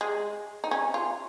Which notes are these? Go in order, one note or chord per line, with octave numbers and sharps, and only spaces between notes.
G#3
D#4
C#4
F4